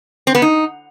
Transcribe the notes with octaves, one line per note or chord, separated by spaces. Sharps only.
C4
B3
D#4